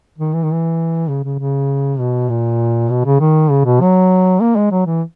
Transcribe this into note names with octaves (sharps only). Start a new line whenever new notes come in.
D#3
E3
D#3
E3
C#3
C#3
C#3
B2
A#2
B2
C#3
D#3
C#3
B2
F#3
A#3
G#3
F#3
E3